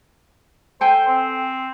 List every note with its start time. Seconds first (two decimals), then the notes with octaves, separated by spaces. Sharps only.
0.81 A4 C5 G5 G#5
1.08 C4